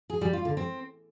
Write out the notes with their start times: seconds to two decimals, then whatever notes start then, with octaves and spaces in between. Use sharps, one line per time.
0.10 G#4
0.21 G3
0.33 F4
0.45 D3
0.57 C4